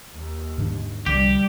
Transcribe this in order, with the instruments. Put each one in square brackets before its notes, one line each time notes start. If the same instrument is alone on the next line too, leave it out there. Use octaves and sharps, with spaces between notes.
[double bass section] D#2
[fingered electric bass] G#2 D3 D#3
[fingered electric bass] C2 D3 F3 [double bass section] G3 [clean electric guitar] G4